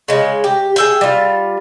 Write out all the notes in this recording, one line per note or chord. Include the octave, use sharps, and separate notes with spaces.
C#3 G#3
G4
G#4 E5 G5
G3 F4